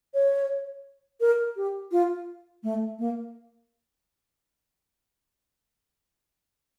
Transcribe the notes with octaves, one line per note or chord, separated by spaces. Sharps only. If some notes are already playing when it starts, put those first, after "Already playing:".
C#5
A#4
G4
F4
A3
A#3